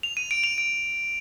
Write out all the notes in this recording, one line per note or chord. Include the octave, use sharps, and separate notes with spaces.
F7
D#7
D7
F7
D7